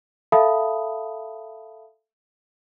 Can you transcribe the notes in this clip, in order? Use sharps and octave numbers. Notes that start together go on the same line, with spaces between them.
A4 E5 F5 A5 B5 D#6